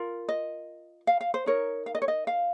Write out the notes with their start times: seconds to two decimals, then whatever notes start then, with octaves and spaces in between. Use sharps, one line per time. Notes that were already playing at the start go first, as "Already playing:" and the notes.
Already playing: F4 A#4
0.29 D#5
1.07 F5
1.21 F5
1.34 C5
1.46 D#4 A#4 C#5
1.86 F5
1.95 D#5
2.02 C#5
2.08 D#5
2.27 F5